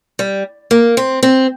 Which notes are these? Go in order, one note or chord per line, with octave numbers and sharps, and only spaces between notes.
G3
A#3
C4
C4